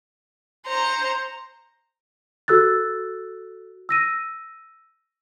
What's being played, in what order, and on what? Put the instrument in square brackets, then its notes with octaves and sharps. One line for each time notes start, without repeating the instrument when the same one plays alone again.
[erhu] C5 [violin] A#5 C#7
[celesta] F#4 A4 E6 F#6 A6
E6 A#6 D#7